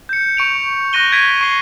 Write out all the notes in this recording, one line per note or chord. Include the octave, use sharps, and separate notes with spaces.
G6 C#7
C#6 D7 F7
C#6 F#6 A#6 D#7 G7
G#6 A#6 B6 D7 D#7
C#6 C7 G7